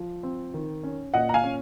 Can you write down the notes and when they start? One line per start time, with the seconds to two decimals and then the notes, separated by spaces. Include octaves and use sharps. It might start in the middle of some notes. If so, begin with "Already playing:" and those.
Already playing: F3
0.23 C4
0.54 D#3
0.84 C#4
1.14 A#2 D#5 F#5
1.29 A#5
1.34 F5 G#5
1.44 C#4